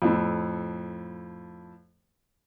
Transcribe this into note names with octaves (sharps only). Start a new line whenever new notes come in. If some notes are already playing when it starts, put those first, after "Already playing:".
F2 A2